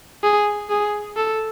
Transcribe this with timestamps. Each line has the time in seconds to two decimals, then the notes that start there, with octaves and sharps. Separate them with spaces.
0.23 G#4
0.70 G#4
1.16 A4